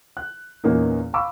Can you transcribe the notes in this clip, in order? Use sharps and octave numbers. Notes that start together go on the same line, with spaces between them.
F#6
E2 A#2 A#3 C#4 D#4
F5 A#5 B5 C#6 D6 E6